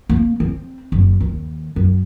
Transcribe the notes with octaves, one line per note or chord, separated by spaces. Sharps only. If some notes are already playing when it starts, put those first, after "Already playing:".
A#3
C4
F#1
D#2
F#2